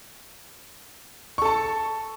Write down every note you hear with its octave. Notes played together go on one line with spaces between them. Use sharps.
A4 A5 C#6